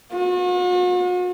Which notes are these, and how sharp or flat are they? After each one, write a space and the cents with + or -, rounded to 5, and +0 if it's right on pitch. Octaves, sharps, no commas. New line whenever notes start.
F#4 -45